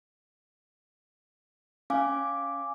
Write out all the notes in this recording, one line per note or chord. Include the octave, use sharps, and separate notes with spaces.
C#4 F5 G#5 D6